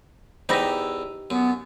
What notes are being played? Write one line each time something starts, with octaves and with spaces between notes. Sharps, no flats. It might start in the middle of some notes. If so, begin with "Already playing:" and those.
E2 E3 D#4 G4 C5 E5 B5 A#6
F#2 B3